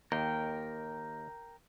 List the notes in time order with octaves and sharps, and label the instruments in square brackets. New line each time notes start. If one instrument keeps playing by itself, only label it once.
[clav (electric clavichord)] D#2 [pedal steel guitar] A#4 G5